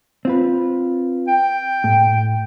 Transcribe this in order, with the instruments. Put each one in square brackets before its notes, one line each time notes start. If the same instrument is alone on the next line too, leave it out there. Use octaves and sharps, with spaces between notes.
[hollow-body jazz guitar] C4 F4 B4
[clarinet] G5
[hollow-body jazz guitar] A2